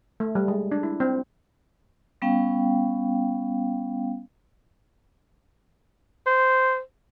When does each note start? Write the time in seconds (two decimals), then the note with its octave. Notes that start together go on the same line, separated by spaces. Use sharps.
0.20 A3
0.35 G3
0.48 G#3
0.71 D4
0.83 E4
1.00 C4
2.22 G3 B3 C#4 F5 G5
6.27 C5